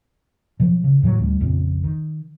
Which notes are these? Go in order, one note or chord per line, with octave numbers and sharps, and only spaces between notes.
B2 F3 F#3
C#3
F#2 A2 E3 F#3
D2 G3
A#1 F2 A#2 C#3
D#3